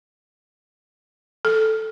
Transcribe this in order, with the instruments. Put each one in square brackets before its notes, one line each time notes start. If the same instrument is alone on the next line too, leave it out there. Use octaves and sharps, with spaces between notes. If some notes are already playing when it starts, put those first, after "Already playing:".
[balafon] A4